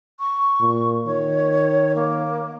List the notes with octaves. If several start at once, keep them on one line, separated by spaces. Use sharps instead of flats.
C#6
A#2
D#3 C#5
A#3